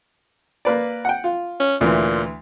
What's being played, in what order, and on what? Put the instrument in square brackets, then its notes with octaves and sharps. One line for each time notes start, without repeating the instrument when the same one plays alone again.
[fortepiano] A#3 B4 D5
F#5 G5
F4
[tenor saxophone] C#4
[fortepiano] D2 E3 [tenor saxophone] A#2